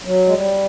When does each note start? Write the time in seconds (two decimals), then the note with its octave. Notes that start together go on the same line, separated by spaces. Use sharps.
0.05 F#3
0.27 G#3
0.33 G3